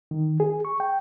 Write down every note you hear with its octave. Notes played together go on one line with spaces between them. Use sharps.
D#3
G#4
C#6
G5